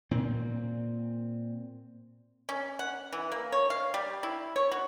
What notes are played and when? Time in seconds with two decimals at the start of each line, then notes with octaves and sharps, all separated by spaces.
0.11 A#2 C4
2.49 C#4
2.79 F#5
3.13 E3
3.32 A#3
3.52 C#5
3.70 F5
3.94 G3
4.23 E4
4.56 C#5
4.72 F#4